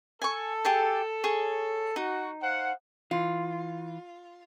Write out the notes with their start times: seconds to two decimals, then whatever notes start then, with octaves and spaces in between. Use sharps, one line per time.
0.22 A4 G#5 C#6
0.65 G4 G#4 A5
1.24 G#4 C#5 C#6
1.96 D#4 F#4
2.42 C5 F5 F#5
3.11 E3 F4